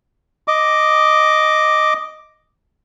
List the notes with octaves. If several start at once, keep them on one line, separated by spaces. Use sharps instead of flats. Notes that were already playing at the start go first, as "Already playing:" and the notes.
D#5 D6